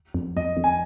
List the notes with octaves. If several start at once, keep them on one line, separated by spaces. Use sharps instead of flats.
F2
F2 D#5
F2
G#5